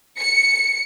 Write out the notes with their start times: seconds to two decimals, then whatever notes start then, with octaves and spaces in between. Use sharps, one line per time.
0.19 C#7